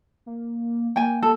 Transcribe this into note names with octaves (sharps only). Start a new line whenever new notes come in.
A#3
A#3 G5 G#5
A4